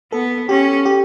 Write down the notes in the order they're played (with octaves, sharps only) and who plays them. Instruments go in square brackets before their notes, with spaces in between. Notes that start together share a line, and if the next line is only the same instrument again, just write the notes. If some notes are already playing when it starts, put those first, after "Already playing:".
[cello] B3 [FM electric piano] A4
[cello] C#4 [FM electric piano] G4
[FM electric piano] G4